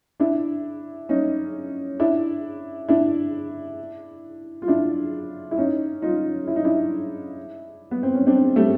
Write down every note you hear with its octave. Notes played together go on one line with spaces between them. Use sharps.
D4 E4
C#4 D#4
D4 E4
D4 E4
F4
D4 E4
E4
C#4 D#4
D#4 F4
E4
D#4
D4 E4
B3
C4
C#4
C4 D4
G3 A3